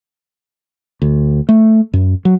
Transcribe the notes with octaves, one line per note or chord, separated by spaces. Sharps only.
D2
A3
F#2
F#3